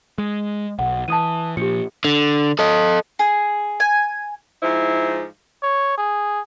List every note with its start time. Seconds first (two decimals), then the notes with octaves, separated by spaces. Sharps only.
0.18 G#3
0.79 B1 F#5
1.08 E3 A5 D#6 D#7
1.57 A#2 F3 G4 C#7
2.05 D3
2.59 A4 D#5
3.19 G#4
3.80 G#5
4.63 G#2 F3 E4
5.63 C#5
5.98 G#4